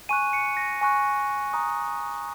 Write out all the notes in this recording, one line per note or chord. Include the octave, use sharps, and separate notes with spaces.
G#5 C#6 F#6 D#7
C#7
A#6
G#5 C#6 F#6
A#5 D#6 F#6